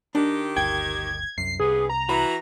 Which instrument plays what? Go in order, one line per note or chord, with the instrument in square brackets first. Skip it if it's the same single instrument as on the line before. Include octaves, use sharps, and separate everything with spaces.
[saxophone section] D#3 G4 [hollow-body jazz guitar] D4
[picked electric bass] G1 D2 [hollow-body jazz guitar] G5 [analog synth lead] G#6
[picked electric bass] C2 F#2 [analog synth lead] C7
[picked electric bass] C2 [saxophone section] G2 B3 [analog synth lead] G#4
[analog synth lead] A#5
[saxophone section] E3 F#4 [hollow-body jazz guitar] B5